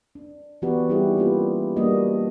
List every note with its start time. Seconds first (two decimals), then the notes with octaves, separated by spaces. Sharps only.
0.15 D4
0.62 E3 B3 F#4 G4 B4 D5
0.89 G3 C4 D#4 E4 G4 G#4
1.17 A#3 C#4 F4 G4 A4 B4
1.76 G3 A#3 C4 D4 F#4 D#5